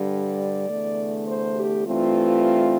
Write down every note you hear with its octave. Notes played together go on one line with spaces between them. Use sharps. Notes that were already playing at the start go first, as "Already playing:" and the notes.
Already playing: G2 D3 G3
D5
E2 D3 A3
C5
G4
G2 E3 A3 C4 F4